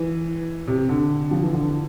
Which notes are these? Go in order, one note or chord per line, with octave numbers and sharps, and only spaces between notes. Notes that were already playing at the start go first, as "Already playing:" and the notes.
Already playing: E3
C3
D3
F3
E3
D3